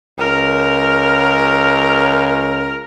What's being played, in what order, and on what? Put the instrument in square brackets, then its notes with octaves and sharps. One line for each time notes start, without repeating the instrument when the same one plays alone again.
[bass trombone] C#2 [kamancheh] A#4 F6